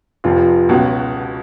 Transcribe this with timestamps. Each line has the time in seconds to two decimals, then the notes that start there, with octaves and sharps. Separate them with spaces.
0.24 F1 F2 F3 F4
0.69 C#2 B2 F#3 F#4